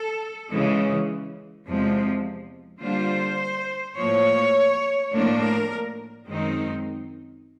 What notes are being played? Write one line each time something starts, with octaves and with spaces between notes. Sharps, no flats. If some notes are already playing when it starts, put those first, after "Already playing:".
Already playing: A4
C#3 E3 G#3
E2 C3 F3 G#3
D3 G3 A#3 D4 F4 C5
A2 F3 A#3 C#5
A2 F3 A#3 D4
A#4
F#2 D#3 G#3 C4 D#4